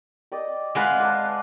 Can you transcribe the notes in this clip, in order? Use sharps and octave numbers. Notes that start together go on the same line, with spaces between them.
G4 D5 D#5
G#3 F4 B4 F#5 B5 C6
A5 D6